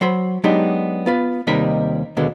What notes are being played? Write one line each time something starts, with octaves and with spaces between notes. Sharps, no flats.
F#3 C5 B5
F#3 G#3 B3 D4 D#4 G4
B3 F4 B4
D#2 C3 G3 D#4 A#4 B5
D#2 B2 D3 G#3 A#3